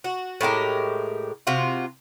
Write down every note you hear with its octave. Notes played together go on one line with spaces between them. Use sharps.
F#4
A2 G#3 G4 A#4
C3 F4 F#4